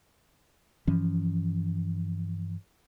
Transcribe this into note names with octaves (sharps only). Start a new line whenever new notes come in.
G2 E3 F3 C#4